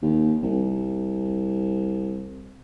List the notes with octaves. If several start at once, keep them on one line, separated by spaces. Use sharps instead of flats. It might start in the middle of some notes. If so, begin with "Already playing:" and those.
D#2
C2